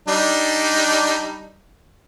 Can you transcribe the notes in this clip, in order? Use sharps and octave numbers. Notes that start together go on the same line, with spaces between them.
G3 D4 D#4